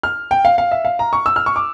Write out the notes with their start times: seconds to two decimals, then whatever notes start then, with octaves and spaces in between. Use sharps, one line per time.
0.03 F6
0.31 G5
0.45 F5
0.58 F5
0.71 E5
0.85 F5
0.99 A#5
1.13 C#6
1.26 E6
1.36 F6
1.46 C#6
1.56 D6